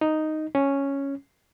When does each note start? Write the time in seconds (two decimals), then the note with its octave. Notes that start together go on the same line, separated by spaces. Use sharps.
0.01 D#4
0.55 C#4